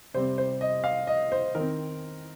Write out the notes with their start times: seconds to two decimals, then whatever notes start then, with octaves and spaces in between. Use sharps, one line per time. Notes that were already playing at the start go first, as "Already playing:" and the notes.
0.14 C3 G3 C4 C5
0.38 C5
0.61 D#5
0.84 F5
1.07 D#5
1.32 C5
1.55 D#3 C4 A#4